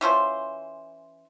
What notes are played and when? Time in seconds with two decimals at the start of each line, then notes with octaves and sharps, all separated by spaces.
0.01 E3 C#4 F4 C5